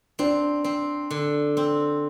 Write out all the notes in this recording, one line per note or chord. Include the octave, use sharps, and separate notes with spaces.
C4 D4
C4
D3
C4